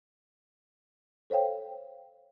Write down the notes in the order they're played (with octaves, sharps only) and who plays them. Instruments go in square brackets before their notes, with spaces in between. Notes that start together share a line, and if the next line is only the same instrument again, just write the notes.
[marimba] A4 C5 C#5 F5 G5